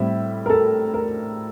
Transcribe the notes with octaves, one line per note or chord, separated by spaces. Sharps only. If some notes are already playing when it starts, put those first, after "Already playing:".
Already playing: A2 G3 C4 E5
A#4
A4
A#4